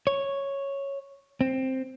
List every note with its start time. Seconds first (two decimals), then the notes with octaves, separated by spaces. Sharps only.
0.07 C#5
1.41 C4